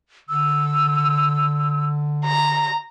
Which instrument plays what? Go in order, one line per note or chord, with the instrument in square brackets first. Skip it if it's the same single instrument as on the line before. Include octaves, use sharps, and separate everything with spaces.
[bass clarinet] D3 [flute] E6
[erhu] A#5